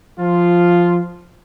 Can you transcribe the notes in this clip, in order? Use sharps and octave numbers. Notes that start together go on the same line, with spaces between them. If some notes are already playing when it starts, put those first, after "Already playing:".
F3 F4